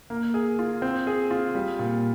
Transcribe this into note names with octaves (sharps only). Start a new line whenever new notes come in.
A#3
G#4
F4
C4
G#4
F4
G3
A#2